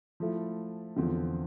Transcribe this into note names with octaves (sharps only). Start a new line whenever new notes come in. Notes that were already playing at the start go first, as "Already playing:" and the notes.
F3 A3 E4
E2 D3 F3 C4